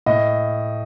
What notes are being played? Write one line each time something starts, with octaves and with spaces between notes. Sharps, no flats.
A2 D#5